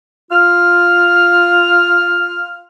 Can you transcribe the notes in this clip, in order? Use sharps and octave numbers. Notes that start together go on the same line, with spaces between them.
F4 F6